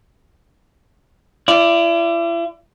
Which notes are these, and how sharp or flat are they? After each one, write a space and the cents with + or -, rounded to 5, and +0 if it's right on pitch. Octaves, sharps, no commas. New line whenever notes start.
E4 +40 D5 +0